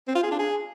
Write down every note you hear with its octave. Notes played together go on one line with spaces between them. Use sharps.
C4
F4
G#4
D4
G#4